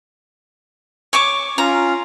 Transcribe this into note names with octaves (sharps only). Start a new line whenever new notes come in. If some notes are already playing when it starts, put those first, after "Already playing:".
C#5 C#6 D6
C#4 F4 A#5